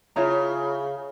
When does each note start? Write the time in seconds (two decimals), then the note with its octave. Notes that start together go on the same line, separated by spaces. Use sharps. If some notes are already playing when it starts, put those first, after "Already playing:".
0.16 C#3 F4 C#5 E5 A#5